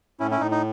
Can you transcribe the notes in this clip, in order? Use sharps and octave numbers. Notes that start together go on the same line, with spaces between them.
A2 C#4 E4
C#4 E4
A2 D#4
D#4